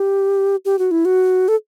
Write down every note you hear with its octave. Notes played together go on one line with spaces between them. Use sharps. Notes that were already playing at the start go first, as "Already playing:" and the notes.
Already playing: G4
G4
F#4
E4
F#4
A4